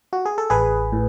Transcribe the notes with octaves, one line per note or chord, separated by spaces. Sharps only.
F#4
G#4
A4
A1 G#4 B4
A2